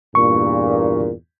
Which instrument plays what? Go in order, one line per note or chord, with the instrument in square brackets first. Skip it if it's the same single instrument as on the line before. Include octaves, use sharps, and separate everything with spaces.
[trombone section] E2 G2 A#2 [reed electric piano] C#6